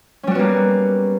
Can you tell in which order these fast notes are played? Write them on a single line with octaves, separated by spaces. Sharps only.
C#4 G3 F#4 B3 A#3